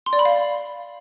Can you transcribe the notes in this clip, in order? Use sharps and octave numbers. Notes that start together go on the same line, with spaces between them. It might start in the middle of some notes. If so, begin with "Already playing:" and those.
C6
D5
B5
F5